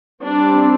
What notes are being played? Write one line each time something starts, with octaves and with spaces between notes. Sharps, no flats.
G3 C4 D4